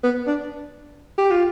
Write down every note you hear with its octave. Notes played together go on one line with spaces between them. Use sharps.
B3
D4
G4
F4